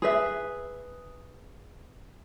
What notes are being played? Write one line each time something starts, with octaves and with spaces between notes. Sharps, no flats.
G#4 B4 E5